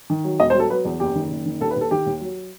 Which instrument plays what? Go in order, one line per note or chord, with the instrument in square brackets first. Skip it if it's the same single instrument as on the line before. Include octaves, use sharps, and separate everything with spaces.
[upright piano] D#3
F#3
E1 D#5
C5
F#3
A4
F#3 B4
E2
F#1 G4
D#3
F#1
D#3
D#2 A4
B4
D#2 A4
D#3 G4
D#2
F#3